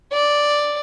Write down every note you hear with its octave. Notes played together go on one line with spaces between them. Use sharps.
D5